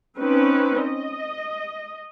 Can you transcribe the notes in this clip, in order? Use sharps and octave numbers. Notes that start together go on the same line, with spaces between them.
C4 C#4 D#4 B4
D#5